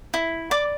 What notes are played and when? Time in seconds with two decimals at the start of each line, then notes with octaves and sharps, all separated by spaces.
0.14 E4
0.51 D5 D6